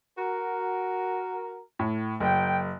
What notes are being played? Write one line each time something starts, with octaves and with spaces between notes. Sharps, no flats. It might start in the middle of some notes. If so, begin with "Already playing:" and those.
F#4 A#4
A2
F#1 F#3 G5